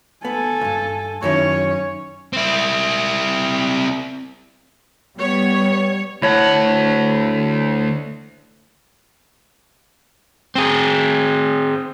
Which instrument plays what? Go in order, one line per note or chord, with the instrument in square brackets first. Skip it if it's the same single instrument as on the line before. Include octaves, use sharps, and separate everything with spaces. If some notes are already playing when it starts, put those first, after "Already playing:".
[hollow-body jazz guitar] B3 [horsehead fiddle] A4 G#5
[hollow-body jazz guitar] D2 G2
[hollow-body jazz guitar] F#2 D#3 E4 [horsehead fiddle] C#4 C#5
[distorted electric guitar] C4 E4
[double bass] G3 [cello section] B3 [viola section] C#5
[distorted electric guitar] D2 F#5 [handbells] E4 C#5 A5
[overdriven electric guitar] C4 G#4